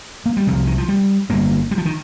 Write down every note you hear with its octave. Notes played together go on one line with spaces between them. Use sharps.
A#3
G3
C2 C3 F3
D#3
F3
G3
G1 G2 A#3
G3
F3
D#3